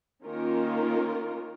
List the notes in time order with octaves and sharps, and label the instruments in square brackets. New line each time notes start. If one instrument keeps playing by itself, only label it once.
[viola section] D#3 A#3 C#4 F4 A#4